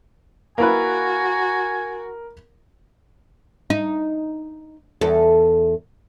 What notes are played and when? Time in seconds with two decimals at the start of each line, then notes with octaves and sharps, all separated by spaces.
0.58 A#3 E4 F#4 A#4 B4 G#5
3.70 D#4
5.01 E2 A4